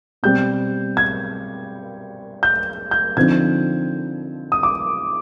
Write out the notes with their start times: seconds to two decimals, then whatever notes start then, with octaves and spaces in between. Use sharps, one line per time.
0.23 B2 G3 C4 G6
0.97 G#6
2.43 G6
2.91 G6
3.17 D3 F3 C4 D#4 G#6
4.52 D#6
4.63 D6